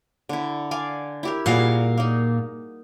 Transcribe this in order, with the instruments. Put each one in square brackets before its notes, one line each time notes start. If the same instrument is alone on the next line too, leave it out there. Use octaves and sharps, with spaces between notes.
[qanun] D3 E4
D5 F5 G#5
E4 G4 A#4
[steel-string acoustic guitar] A#2 A#4 F5 [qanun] G3 F#4 G#4
[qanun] A#3 D#4